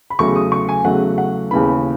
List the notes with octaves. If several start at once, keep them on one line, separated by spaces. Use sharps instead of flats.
B5
E2 C#3 F#3 A3 C#6
D#6
C#6
G#5
E2 C#3 F#3 A3 F#5
F#5
D#2 C#3 E3 B3 B5